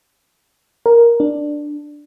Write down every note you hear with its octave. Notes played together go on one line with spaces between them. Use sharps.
A#4
D4